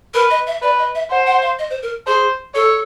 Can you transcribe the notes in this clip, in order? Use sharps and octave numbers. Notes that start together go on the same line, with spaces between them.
A#4 B4
D#5
E5
B4 D5
D#5
E5
C5 F#5
F#5
F5
D#5
C5
A#4
G#4 C5
A4 C#5